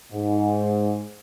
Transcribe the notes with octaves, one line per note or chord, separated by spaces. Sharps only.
G#2